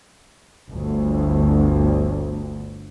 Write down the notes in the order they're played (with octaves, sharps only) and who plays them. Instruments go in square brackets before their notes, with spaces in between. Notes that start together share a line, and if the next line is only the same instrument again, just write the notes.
[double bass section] G1 D2